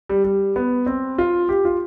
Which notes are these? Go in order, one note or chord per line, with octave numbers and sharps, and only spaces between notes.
G3
G3
B3
C4
F4
G4
F4